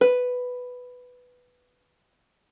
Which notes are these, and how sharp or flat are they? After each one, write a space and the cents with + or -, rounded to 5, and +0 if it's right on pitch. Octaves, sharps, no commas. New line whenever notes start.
B4 +5